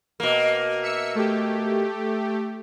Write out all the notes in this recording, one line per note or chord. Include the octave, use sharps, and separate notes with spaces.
B2 A#3
E5 E6 C#7
A3 G4